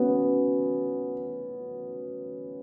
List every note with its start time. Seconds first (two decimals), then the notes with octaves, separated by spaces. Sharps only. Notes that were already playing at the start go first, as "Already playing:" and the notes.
Already playing: B3 C#4 F#4